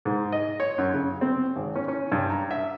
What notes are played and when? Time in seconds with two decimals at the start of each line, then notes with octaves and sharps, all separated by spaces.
0.05 G#2
0.32 D#5
0.60 C#5
0.78 F#2
0.94 C#3
1.21 C4
1.56 G#1
1.76 C#4
1.88 C#4
2.12 G2
2.30 A#5
2.51 E5